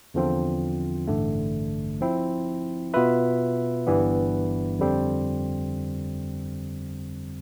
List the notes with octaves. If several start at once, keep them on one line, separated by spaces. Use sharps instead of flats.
E2 D3 F3 C4 F4
A1 G2 D3 A3
F3 C4 E4
B2 B3 F4 B4 E5
G1 G2 E3 G3 B3
F2 D3 G3 C4